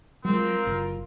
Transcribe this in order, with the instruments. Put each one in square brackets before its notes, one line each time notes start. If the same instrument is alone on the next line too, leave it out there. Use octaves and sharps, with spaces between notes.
[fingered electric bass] F#3 G#3 [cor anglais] C4 [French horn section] F4 A#4
[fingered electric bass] F#1